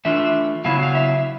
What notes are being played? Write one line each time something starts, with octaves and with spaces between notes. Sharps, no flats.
E3 A3 D4 F4 E5
C#3 F#3 B3 E4 F5
F5
E5